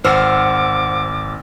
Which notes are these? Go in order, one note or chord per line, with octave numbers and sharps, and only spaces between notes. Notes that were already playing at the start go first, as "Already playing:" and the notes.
G#1 C5 F#5 D6 E6 F6